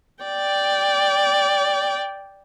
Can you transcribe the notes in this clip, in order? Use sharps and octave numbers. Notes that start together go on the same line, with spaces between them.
D5 G5